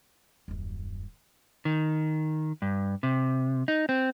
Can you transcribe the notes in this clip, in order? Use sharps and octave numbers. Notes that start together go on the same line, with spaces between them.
D#1 F#2
D#3
G2
C3
D#4
C4